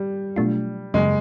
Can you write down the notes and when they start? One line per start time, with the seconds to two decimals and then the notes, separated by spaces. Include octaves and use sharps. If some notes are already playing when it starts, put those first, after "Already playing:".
Already playing: G3
0.36 B2 F#3 A3 D4 F4
0.94 F#2 C#3 F#3 G#3 A#3